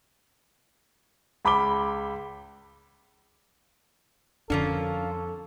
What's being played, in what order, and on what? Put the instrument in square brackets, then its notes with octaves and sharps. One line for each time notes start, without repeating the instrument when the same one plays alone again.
[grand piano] C#2 B5 D6 G7
[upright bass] F2 [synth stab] D3 D4 [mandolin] A#3 C#4 F4 [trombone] A4